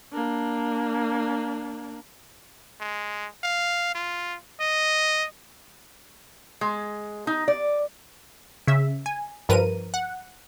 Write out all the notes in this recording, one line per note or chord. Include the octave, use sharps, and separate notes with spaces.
A#3 D4
G#3
F5
F4
D#5
G#3
D#4
D5
C#3 E5
G#5
G2 F3 A#4 B4 D#7
F#5